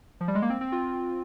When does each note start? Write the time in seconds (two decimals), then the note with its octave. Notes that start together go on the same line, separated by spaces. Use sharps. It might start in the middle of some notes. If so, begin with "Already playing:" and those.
0.21 F3
0.28 G3
0.35 G#3
0.42 A#3
0.50 C4
0.61 C4
0.72 F4